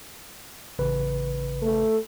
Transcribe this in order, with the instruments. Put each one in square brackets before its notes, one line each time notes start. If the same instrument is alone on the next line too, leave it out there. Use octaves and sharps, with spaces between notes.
[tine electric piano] A1 C#3 B4
[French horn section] A3 A4